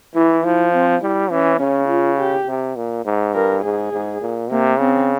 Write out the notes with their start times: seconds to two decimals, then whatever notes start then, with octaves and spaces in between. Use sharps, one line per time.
0.15 E3 E4
0.44 F3 E4
0.73 C4
1.02 G3 E4
1.31 E3 C#4
1.60 C#3 C#4
1.89 F4
2.18 G4
2.47 C3
2.76 A#2
3.05 G#2
3.34 G2 A#4
3.63 G#2 G#4
3.93 G#2
4.21 A#2
4.50 C3 A#3
4.79 C#3 C4